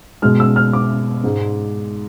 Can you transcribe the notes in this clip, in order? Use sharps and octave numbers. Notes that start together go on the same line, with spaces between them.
B2 G#3 F6
E6
F6
D6
G#2 G#3